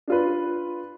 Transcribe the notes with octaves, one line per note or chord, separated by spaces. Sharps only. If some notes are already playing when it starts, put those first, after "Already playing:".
D4 F4 B4